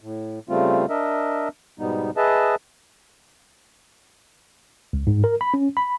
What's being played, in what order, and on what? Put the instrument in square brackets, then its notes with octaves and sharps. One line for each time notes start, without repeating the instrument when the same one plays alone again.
[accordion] A2
C#3 G3 A3 C4 F4
D4 A#4 D#5 E5
G#2 B2 G3 B3 D#4
G#4 B4 D#5 E5 A5
[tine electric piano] C#2
G#2
A#4
B5
C#4
B5